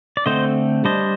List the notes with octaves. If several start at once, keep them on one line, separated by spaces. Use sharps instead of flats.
D5
D3 A3 C4 C5 D#5
G3 D4 C5 D#5